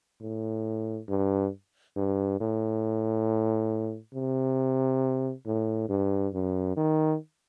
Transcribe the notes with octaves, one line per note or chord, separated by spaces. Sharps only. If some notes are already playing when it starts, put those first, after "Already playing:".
A2
G2
G2
A2
C3
A2
G2
F#2
D#3